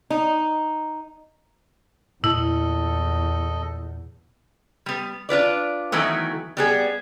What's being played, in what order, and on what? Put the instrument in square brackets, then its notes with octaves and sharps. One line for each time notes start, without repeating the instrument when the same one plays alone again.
[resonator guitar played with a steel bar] D#4
[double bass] E2 [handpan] A#2 [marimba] E4 [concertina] A4 D#5
[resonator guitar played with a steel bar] G3 B3
D4 F4 B4 D5
D#3 E3 F#3 A3 B3
G3 B3 G#4